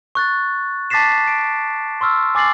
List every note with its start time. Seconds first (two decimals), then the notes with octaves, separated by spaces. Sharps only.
0.15 C#6 F#6 A6
0.90 A5 D6 A6 B6 C7 E7
1.28 D7
2.01 C6 C#6 E6 F6
2.35 G#5 D6 A6 C7 F#7